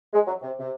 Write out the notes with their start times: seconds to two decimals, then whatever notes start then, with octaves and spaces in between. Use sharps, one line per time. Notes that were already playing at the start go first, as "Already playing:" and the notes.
0.13 G#3
0.27 F#3
0.42 C3
0.60 C3